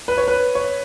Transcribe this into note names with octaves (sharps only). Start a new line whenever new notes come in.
B4
C#5
B4
C#5